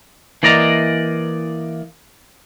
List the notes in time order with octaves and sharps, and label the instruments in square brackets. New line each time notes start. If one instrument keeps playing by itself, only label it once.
[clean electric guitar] E3 A#3 D5 D#5 A#5